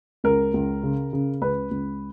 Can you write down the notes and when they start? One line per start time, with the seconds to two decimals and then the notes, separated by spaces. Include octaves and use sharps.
0.24 C#2 A#4
0.54 C#2
0.83 C#3
1.13 C#3
1.42 C#2 B4
1.71 C#2